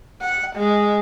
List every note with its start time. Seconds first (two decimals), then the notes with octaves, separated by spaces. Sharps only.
0.21 F#5
0.56 G#3